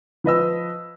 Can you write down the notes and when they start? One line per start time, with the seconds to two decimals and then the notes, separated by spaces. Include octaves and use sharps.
0.24 F3 B4 D#5 E6